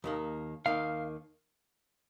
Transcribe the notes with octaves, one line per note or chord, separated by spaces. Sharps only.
D#2 D#3 A#3
D#2 D#3 A#3 F5